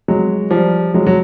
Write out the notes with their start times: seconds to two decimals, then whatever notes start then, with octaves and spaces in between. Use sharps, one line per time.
0.08 F#3 G#3
0.51 F3 G3
0.94 F#3 G#3
1.07 F#3